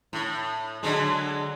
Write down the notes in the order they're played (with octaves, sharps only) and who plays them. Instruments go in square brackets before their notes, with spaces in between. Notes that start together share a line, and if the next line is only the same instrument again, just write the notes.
[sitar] A2
D3 F#3 G#3